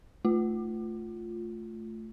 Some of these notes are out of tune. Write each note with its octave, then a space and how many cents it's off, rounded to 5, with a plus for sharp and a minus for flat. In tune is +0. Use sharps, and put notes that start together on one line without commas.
A3 +0 F4 +0